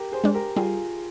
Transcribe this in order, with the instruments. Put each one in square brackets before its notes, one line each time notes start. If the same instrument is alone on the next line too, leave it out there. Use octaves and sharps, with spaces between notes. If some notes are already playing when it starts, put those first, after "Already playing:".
Already playing: [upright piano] G4 A#4
G#4 C5
[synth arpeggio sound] G#3 D4
[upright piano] G4 A#4
[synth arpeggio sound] G3 [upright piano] F4 G#4